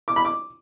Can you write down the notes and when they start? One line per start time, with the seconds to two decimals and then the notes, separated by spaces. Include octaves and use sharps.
0.08 D6
0.16 B5
0.25 D6